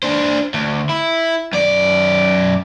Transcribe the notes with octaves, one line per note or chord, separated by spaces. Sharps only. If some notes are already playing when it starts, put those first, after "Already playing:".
D4 C5
D2
E4
F#2 D5